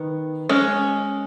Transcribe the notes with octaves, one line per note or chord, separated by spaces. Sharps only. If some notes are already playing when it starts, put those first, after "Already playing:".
Already playing: D#3 B3
G#3 C#4